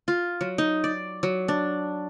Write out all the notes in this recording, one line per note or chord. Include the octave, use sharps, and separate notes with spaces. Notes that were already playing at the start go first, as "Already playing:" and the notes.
F4
F#3
D#4
D5
F#3
D4